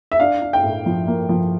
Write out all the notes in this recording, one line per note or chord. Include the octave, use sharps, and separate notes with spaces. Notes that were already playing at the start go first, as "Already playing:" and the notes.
E5
D4 F5
D4
G5
A2
F3
A#3
F3